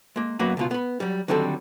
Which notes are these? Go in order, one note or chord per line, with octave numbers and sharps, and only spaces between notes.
G#3 A#3
F#2 F#3 A#3 B3 F#5 B5
C#2 B2 F4
B3 B5
F#3 G3
D3 D#3 F#3 G3 C4 A4